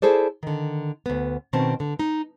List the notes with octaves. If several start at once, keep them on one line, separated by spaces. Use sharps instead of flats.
E4 G#4 A4 C5 D5
D3 D#3
D2 B3
B2 D#3 C4 C#4 A5
D3
D#4